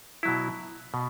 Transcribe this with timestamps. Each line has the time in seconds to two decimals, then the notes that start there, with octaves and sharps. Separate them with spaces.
0.23 B2 F#3 E4
0.94 B2